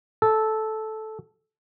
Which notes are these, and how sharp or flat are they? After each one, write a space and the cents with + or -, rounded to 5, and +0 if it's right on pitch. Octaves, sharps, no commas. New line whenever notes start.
A4 -10